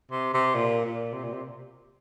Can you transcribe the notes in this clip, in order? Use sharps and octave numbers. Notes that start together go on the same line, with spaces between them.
C3
C3
A#2
A#2
C3
A#2
C3